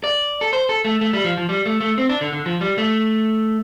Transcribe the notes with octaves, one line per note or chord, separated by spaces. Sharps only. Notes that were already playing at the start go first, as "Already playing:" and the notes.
D5
A4
C5
A4
A3
A3
G3
F3
F3
G3
A3
A3
C4
D4
D3
D3
F3
G3
A3